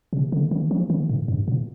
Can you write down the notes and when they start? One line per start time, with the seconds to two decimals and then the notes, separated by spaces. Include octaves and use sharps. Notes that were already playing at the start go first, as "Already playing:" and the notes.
0.13 C3
0.32 D3
0.51 D#3
0.71 F3
0.90 D#3
1.09 A2
1.28 G2
1.48 A#2